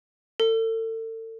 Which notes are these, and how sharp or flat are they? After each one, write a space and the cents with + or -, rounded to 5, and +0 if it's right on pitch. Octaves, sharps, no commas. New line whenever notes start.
A4 +35